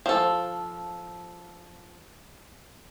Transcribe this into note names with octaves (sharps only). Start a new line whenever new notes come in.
F3 A4